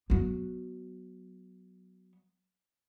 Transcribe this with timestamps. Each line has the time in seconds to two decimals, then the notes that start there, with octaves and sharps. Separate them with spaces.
0.10 F#3 B3